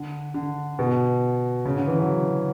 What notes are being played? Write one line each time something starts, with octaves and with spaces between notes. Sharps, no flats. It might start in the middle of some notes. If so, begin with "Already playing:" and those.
Already playing: D3
D3
B2
C#3
D3
E3
F#3